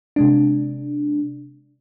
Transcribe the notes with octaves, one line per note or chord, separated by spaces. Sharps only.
C3 G#3 D4